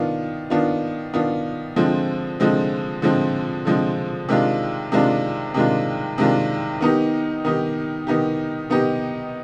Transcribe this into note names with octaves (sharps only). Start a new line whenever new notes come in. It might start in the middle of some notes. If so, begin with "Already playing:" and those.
Already playing: D#3 B3 D4 F4
D#3 B3 D4 F4
D#3 B3 D4 F4
D3 F3 G#3 C4
D3 F3 G#3 C4
D3 F3 G#3 C4
D3 F3 G#3 C4
C3 D#3 G#3 D4 F4
C3 D#3 G#3 D4 F4
C3 D#3 G#3 D4 F4
C3 D#3 G#3 D4 F4
D#3 B3 D#4 G4
D#3 B3 D#4 G4
D#3 B3 D#4 G4
D#3 B3 D#4 G4